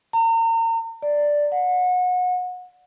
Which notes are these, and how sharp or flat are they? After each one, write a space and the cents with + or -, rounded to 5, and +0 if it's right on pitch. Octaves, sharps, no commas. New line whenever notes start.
A#5 -35
D5 +0
F#5 -30